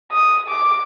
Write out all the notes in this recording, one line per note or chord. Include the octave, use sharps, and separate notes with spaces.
D#6
D6